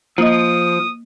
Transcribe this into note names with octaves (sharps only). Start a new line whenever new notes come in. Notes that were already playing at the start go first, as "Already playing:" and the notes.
F3 A#3 D#5 D#6